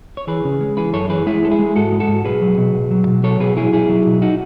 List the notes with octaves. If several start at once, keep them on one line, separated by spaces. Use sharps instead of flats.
C#5
E3 G#4 B4
C#3
G#3
E3 G#4 B4
F#2 A4 C#5
E3 G#4 B4
G#3 E4 G#4
G#3 A4
E4 G#4
G#3
G#2 F#4 A4
G#3
F#4 A4
G#2
B1 G#4 B4
F#3
B2
B1
F#3
B2
F#3 A4 C#5
B2 G#4 B4
F#3 E4 G#4
B1 E4 G#4
F#3
B2
D#4 F#4